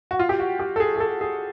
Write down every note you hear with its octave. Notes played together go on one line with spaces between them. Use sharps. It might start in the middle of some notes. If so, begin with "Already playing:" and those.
F#4
F4
G4
F#4
G4
A4
G#4
G#4
A4
G#4